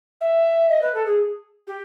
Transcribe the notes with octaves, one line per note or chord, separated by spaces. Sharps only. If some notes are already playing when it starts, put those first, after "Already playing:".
E5
D#5
B4
A4
G#4
G4